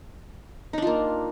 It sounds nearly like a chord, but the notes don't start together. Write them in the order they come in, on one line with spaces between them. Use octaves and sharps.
D#4 D4 F4 A#3